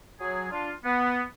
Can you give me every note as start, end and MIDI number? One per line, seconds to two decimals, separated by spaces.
0.20 0.48 54
0.20 0.48 68
0.51 0.71 62
0.51 0.71 65
0.84 1.22 59